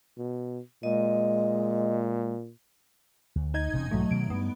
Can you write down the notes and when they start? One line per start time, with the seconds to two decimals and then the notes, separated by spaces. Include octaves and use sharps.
0.17 B2
0.83 A#2 G#3 D#5
3.36 D2
3.54 D#4 D#5 G#6
3.73 E1 C3 C#4
3.91 B1 G#2 E3 F#3 A3
4.11 B2 D#3 F#3 D7
4.30 G2 G3 B3